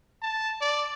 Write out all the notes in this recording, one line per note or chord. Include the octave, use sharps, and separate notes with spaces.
A5
D5